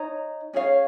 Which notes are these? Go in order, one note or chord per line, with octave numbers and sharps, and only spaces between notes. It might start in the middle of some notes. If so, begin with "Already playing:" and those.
Already playing: D#4 C#5 A#5
C#4 G#4 C#5 F5